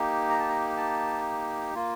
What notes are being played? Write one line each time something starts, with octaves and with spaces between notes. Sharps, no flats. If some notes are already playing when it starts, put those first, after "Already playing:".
Already playing: A#3 D#4 G4
A#5
A5
A#5
A5
A#3 F4